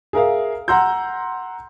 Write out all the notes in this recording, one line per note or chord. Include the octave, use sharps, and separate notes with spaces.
G#4 A#4 E5 F5
F#5 A#5 C6 E6 G6